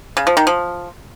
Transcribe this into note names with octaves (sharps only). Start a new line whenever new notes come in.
C#3
F3
D#3
F3